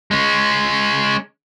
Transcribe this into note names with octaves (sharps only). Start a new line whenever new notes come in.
G#3 C#4